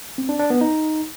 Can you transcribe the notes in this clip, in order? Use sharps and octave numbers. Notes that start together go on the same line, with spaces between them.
C4
D4
D4
B3
D#4